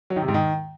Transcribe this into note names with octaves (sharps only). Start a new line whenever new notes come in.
F#3
D#3
C3
G#2
D#3